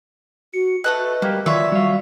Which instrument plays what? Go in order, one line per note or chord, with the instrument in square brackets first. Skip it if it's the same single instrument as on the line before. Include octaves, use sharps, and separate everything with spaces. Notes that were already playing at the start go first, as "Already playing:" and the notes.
[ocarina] F#4 [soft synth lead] C#7
[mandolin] A3 A4 F#6 [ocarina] B4 [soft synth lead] D#5
[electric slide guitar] G3 G4 [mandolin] A#3
[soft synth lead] D#3 [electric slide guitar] F#3 F4 B4 [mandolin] C#5 E5 [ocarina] D5
[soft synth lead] G3 [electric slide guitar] F#4 F5